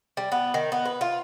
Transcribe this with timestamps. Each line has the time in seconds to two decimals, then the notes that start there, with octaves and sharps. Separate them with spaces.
0.17 G3
0.32 B3
0.54 D#3
0.72 B3
0.85 B4
1.01 F4